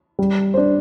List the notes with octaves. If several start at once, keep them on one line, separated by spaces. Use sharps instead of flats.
G3
D4 C5